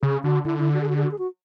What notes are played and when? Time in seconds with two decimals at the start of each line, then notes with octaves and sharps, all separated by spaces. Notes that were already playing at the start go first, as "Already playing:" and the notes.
0.02 C#3 G#4
0.24 D3 F#4
0.45 D3 E4
0.59 E4
0.74 F#4
0.81 G#4
0.89 F#4
0.96 G#4
1.04 F#4
1.11 G#4
1.19 F#4